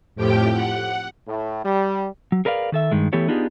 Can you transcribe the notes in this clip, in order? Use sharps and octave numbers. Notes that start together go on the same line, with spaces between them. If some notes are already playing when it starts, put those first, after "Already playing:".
F2 A2 F3 G4 G5
F#5
A2
G3
F#3
G#4 A#4 B4 D5 F5
D#3 A4 E5
G2 D#3 G#3
E3 A3 B3 G4 A4 C#5
B3 D4 D#4 F4 G4 G#4